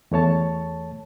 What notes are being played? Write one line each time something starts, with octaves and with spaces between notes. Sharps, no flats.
E2 A3 C#5 A5